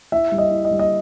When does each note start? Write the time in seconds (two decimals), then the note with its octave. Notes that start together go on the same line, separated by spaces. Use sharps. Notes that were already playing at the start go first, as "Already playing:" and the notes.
0.12 E4 E5
0.32 G3
0.38 D#5
0.51 E4
0.65 D#5
0.71 G3
0.79 D#5